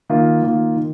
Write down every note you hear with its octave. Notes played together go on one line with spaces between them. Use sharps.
D#3 A#3 F4
D#3 A#3 F4
D#3